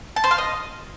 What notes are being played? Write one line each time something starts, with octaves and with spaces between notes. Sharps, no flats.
A5
C5
F5
D#5